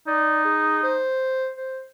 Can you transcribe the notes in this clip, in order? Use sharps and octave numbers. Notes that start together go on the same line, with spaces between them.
D#4 D5
G#4
C5
C5